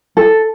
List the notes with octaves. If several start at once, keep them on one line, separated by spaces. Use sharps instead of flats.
A4